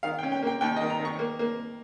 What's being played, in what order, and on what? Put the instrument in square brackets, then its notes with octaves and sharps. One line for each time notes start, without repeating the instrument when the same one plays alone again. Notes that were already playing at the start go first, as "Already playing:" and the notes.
[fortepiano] D#3 F5
G5
C#4
G5
A#3 G5
D#2 G5
D#5
D#3
A#5
D#3
C#6
A#3
A#3